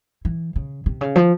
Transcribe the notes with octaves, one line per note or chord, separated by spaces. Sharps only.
E3
C#3
C3
C#3
F3